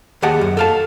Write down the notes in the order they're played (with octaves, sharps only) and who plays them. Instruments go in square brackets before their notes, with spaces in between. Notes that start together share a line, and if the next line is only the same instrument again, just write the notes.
[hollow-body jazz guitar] D#2 G4 G#4 D#5 F#5 A5
F#2
A4 F5 A5